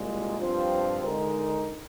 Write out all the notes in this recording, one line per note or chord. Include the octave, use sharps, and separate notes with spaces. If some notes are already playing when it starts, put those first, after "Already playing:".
Already playing: C2 A#2 G#3
G2 F3 C4 F4 C5
D3 G#3 D#4 A#4